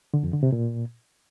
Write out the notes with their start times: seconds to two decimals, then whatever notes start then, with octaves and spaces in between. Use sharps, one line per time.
0.14 D3
0.23 F2
0.33 D3
0.43 C3
0.52 A#2